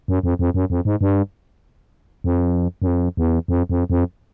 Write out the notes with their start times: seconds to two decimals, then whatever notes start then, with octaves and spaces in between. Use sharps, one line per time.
0.08 F#2
0.23 F2
0.39 F2
0.54 F#2
0.70 F2
0.85 G#2
1.01 G2
2.24 F2
2.82 F#2
2.87 F2
3.17 E2
3.48 F2
3.70 F2
3.90 F2